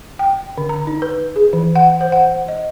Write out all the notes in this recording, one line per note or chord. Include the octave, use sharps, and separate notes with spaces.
G5
D3
A#5
D#4
B4
G#4
E3
F#5
C5
F#5
D#5